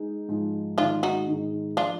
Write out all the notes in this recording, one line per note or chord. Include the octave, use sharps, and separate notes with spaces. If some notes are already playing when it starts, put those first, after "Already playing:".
Already playing: G#3 D#4
G#2 F3 G#3 D#4
G#2 D#3 G#3 D4 F4
D#4 F#4
G#2 D#3 G#3
F3 D4 F4